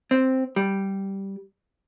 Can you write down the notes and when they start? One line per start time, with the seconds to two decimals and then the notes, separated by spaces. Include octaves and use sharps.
0.11 C4
0.56 G3